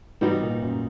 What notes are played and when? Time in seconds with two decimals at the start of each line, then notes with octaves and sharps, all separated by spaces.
0.21 G#2 E3 G3 B3 D#4 F#4
0.42 A#2
0.62 F#2